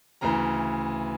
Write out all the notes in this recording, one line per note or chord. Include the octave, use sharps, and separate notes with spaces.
D2 C#3 E3 A#5